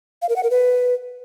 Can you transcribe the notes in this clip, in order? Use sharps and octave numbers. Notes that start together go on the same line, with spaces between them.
F5
A#4
F#5
A#4
B4